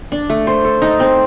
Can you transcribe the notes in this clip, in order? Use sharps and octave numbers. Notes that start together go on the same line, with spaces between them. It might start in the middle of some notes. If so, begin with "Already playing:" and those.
D4
A3
C5
A4
D#4
C4